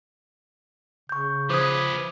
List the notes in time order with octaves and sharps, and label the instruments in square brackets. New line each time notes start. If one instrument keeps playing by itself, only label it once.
[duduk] C#3 [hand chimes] C#6 G6
[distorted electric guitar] F3 B4 [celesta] C5 D#6 [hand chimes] D6 G#6